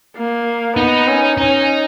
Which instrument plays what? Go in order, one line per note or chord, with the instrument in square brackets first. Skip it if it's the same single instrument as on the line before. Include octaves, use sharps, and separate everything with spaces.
[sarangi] A#3
[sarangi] B3 [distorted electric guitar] D#4
[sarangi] C#4
[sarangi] C#4 [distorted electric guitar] D#4